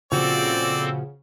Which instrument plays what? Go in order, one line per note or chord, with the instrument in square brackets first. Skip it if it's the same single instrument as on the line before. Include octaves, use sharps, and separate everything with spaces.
[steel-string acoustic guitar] A#2 F3 F#4 [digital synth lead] C#3 [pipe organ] C4 A4 C5 [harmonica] D5